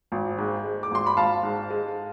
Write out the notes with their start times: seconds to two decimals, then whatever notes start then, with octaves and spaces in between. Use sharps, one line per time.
0.12 G#1
0.38 G#2
0.64 G#3
0.83 D6
0.91 G#1 C6
1.06 B5
1.17 G#1 F5 A5
1.43 G#2
1.70 G#3